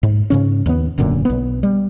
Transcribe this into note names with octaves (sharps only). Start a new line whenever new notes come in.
G#2
G#2 C#3 C#4
D#2 B3
E1 F#2 A#2 D3
B1 B3
G3